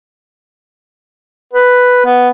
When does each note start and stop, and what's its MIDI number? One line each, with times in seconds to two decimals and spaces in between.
1.53 2.03 71
2.05 2.29 59